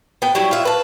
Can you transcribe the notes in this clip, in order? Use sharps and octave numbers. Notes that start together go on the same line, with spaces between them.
B3 G5
F#3 G3 E4
F4 E5
B4 A5